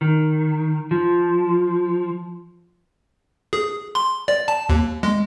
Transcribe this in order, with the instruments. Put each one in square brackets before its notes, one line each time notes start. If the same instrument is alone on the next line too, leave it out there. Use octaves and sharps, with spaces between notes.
[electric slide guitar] D#3
F3
[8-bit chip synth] G#4
C6
D5
A5
D#2
G#3